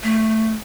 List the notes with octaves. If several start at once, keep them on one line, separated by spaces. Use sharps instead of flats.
A3